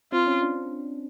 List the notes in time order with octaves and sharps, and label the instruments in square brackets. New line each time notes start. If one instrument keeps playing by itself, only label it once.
[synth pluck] C4 [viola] F4
[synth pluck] C#4
D4